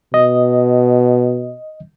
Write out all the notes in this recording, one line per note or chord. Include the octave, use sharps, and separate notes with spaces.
B2 D#5